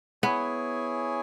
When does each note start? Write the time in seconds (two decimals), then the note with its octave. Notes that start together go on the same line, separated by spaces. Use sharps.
0.23 B3 E4 G#4 C#5 G#5